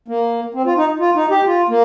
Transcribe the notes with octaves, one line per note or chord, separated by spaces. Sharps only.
A#3
C4
F4
D#4
F4
D#4
G4
F4
A#3